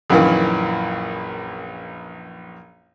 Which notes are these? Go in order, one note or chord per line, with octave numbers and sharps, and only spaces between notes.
A#1 F#2 A#2 D#3 E3